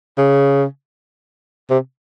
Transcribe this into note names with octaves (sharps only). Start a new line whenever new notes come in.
C#3
C3